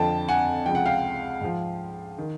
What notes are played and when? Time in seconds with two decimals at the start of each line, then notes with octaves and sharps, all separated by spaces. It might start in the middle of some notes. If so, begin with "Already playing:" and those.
Already playing: F2 D3 F3 G5 A5
0.28 F#5 G#5
0.66 C#2 C3 F3 G5
0.75 F#5
0.86 F5 G5
1.41 G#2 F3
2.18 D#3